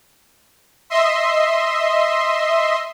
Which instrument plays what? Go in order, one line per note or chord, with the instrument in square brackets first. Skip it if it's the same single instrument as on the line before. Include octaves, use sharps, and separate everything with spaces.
[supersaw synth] D#5 E5 C6